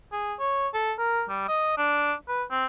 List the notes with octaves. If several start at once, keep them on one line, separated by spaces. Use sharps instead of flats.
G#4
C#5
A4
A#4
G3
D#5
D4
B4
C4